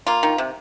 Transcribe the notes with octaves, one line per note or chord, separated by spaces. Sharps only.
A#3 F4
D#3
C3